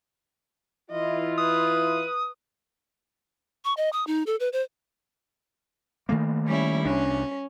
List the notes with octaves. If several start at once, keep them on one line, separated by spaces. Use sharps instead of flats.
E3 E4 F4 D#5
B4 D#6
C#6
D#5
D#6
D#4
A4
B4
C5
D#3 A3 A#3
G3 C#4 E4
C2 C#4 D4